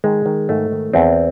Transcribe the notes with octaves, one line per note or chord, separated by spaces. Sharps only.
D#3 G#3
D#3
G#2 A3
D#3
E2 C4